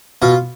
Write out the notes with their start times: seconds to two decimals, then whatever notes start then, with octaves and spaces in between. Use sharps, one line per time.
0.22 B2 F4